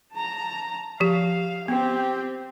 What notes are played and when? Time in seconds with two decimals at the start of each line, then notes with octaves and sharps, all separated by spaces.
0.14 A5 A#5
1.00 F3 G4 F5
1.68 B3 C4 G4